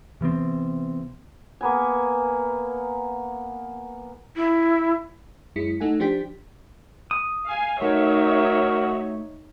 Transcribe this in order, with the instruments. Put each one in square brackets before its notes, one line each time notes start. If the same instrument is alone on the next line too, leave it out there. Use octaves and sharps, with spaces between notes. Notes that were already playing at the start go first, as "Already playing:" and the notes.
[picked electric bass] C3 E3 B3 C4
[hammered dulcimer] A#3 B3 G#5
[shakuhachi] E4
[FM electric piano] F#2 G#3 E4 B6 C#7
A3 D#4 A4 F#5 G#5
F3 D4 G4 C5 G5 B6
[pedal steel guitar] D#6
[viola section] F5 G#5
[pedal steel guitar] A3 [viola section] D#4 C#5 E5 [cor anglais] F#4 [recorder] A#4